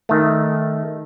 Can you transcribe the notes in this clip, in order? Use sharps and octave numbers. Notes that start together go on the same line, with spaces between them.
D#3 A3